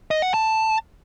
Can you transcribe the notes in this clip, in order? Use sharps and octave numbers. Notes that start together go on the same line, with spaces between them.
D#5
F#5
A5